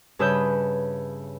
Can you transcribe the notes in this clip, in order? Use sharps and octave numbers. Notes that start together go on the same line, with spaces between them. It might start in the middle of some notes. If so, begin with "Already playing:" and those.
G2 C#3 B4 E5 D#6 G6